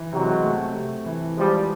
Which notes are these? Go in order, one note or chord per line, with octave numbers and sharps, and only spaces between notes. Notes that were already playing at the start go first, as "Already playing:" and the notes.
Already playing: E3
C3 F#3 G#3
A3
C3
E3
F3 G3 G#3